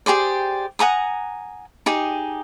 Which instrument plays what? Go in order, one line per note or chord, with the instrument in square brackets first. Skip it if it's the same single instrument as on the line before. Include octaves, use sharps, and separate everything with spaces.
[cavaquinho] G4 G#4 C5 D5
F#5 G#5 A#5 D#6
D#4 G4 G#4